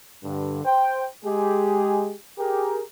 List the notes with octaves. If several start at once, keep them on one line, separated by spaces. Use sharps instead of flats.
G2 D3
C5 G5
G#3 G4 G#4
G4 G#4 A#4